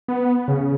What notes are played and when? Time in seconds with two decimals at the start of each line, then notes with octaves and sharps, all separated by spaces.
0.08 B3
0.48 C#3